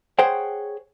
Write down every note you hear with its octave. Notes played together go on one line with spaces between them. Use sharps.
G#4 C5 C#5 F#5 G5